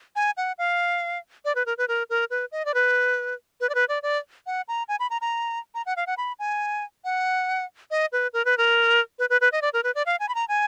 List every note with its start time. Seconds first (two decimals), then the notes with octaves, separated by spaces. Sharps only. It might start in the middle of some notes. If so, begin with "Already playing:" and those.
0.16 G#5
0.37 F#5
0.58 F5
1.45 D5
1.55 B4
1.66 A#4
1.78 B4
1.88 A#4
2.10 A#4
2.30 B4
2.52 D#5
2.65 D5
2.74 B4
3.61 B4
3.69 D5
3.75 B4
3.89 D5
4.03 D5
4.47 F#5
4.68 A#5
4.89 G#5
5.00 B5
5.10 A#5
5.21 A#5
5.75 A#5
5.86 F#5
5.97 F5
6.07 F#5
6.18 B5
6.39 G#5
7.05 F#5
7.91 D#5
8.12 B4
8.33 A#4
8.45 B4
8.58 A#4
9.19 B4
9.30 B4
9.41 B4
9.52 D#5
9.62 D5
9.73 A#4
9.84 B4
9.95 D5
10.06 F5
10.20 G#5
10.29 B5
10.35 A#5
10.49 G#5